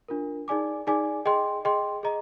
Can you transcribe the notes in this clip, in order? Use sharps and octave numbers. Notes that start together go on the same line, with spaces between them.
D4 F4 A#4
D#4 G#4 D5 G#5 D6
D#4 G#4 D5 G#5 D6
G#4 D#5 G5 C6
G#4 D#5 G5 C6
G#4 D#5 A#5